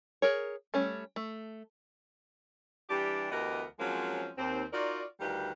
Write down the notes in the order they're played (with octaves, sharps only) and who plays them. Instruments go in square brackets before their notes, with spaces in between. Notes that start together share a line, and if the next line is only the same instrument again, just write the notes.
[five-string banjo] G#4 A#4 C#5
G3 A3 C#4
A3
[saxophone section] E3 G3 D4 G4
D2 E3 B3 G4 A#4 D#5
F3 F#3 G#3 A#3 C4 C#4
D#2 C4
D#4 F4 F#4 A#4 D5
D2 D#3 G3 F4 G4 B4